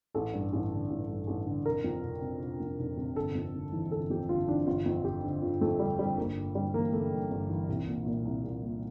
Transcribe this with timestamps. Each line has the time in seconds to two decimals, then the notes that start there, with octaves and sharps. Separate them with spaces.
0.15 A1 A4
0.33 G2
0.53 A1
0.71 D3
0.90 A1
1.09 G2
1.27 A1
1.47 D3
1.65 F1 A#4
1.84 F2
2.03 F1
2.22 C3
2.41 F1
2.60 F2
2.79 F1
2.97 C3
3.16 G1 A4
3.35 F2
3.54 G1
3.73 E3
3.91 G1 A4
4.10 F2 G4
4.29 G1 F4
4.48 E3 D4
4.67 G1 F4
4.86 F2
5.04 G1 G4
5.23 D3
5.42 G1 F4
5.61 F2 A3
5.80 G1 G3
5.99 D3 G3
6.17 G1 A#3
6.36 G2
6.55 G1 G3
6.74 E3 A#3
6.93 G1 A3
7.12 G2
7.31 G1
7.49 E3
7.68 C2
7.87 A#2
8.06 A#2
8.25 C2
8.44 C2
8.63 A#2